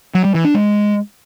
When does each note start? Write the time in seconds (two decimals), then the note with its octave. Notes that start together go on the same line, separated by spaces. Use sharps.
0.15 F#3
0.25 G3
0.34 E3
0.44 D4
0.54 G#3